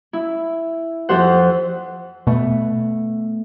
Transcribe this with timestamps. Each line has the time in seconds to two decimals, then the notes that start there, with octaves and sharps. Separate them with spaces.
0.13 E4
1.09 F2 G4 C5 F#5
2.27 B2 A3 B3